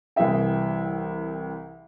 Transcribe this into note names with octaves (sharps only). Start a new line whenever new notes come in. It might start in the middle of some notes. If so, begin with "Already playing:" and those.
C2 E3 E4 G#4 E5 G5